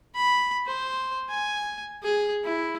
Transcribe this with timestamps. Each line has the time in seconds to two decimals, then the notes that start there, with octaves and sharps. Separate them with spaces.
0.15 B5
0.67 C5
1.29 G#5
2.03 G#4
2.44 E4